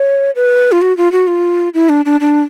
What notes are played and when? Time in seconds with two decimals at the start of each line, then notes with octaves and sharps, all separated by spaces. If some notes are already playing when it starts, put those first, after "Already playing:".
Already playing: C#5
0.36 B4
0.72 F4
0.82 F#4
0.97 F4
1.12 F#4
1.27 F4
1.74 E4
1.89 D4
2.05 D4
2.21 D4